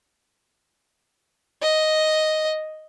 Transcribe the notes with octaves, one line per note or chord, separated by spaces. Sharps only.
D#5